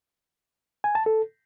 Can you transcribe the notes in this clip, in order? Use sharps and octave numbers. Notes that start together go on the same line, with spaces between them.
G#5
A5
A4